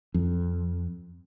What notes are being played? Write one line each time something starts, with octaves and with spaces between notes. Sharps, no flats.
F2